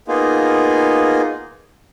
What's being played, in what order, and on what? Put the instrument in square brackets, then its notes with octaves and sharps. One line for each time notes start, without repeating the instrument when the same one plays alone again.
[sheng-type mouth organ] A#3 B3 D#4 F4 G#4